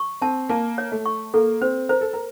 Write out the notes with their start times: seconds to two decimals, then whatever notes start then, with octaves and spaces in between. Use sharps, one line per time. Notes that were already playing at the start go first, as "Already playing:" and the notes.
Already playing: C#6
0.21 C4 A5
0.49 A#3 A5
0.78 C#5
0.92 A3
1.06 C#6
1.34 A#3 A4
1.61 C4 C5
1.89 A#4 C5
2.01 A4
2.13 A#4